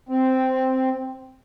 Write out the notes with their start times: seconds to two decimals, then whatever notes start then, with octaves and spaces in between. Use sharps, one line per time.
0.09 C4